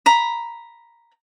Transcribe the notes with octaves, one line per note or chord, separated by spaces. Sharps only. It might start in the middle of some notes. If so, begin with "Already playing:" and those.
A#5 B5